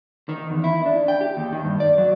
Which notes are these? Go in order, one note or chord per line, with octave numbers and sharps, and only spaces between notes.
D#3
E2
E4
D4
G5
G4
D#2
D#3
G2
D5
F#3